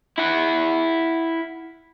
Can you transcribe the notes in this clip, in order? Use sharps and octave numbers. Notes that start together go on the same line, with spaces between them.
E4 F#5